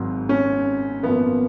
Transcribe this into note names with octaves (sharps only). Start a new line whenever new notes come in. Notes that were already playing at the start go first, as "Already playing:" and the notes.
Already playing: G#1 G#2 F#3
C#4
G#1 F#2 F3 A#3 B3